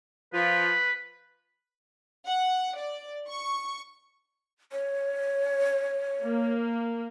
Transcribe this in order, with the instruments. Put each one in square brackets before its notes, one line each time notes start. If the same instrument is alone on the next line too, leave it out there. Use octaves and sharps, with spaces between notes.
[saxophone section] F3 F4 [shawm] B4
[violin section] F#5
D5
C#6
[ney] C#5
[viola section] A#3